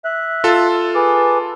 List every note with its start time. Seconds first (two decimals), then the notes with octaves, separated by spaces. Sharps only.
0.05 E5 F#6
0.44 F4 A4 A5
0.95 G#4 B4 D6